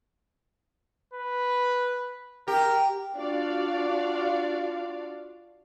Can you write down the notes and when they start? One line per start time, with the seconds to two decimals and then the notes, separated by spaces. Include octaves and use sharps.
1.14 B4
2.48 G4 A#4
3.15 D4 F4 F#4 D5 F5